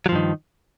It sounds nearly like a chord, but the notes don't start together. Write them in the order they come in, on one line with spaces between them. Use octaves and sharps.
F#3 F3 G2 D#3